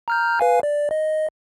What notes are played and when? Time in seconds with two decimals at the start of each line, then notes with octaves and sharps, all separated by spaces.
0.08 A#5 F6 G6
0.40 B4 F5 G#5
0.63 D5
0.91 D#5